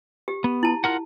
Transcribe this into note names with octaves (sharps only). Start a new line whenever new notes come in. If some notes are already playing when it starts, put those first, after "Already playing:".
G4
B3
E4 A5
F4 A#4 F#5